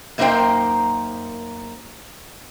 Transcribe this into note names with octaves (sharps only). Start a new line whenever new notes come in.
F#2 A#3 D#4 A#4 C5 G5